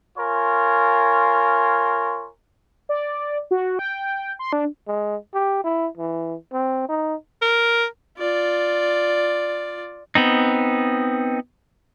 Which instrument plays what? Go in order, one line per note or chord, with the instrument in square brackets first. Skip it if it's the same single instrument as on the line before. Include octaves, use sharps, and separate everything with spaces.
[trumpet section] F4 A#4 C#5 G#5 C6
[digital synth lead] D5
F#4
G5
C6
D4
[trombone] G#3
G4
E4
E3
C4
D#4
[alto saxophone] A#4
[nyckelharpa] F4 D5
[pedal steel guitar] B3 C4 D#4